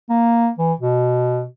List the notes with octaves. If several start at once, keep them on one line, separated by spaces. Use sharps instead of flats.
A#3
E3
B2